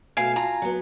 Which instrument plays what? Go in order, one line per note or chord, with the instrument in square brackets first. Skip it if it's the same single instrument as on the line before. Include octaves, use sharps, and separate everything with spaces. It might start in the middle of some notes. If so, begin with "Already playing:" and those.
[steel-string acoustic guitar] B2 A3 [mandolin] F5 [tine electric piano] G#5
[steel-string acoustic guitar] F4 [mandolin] A#5
[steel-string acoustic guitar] F#3 B3